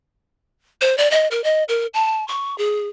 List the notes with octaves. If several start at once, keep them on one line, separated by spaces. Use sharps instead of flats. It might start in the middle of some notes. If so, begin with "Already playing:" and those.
C5
D5
D#5
A#4
D#5
A#4
A5
C#6
G#4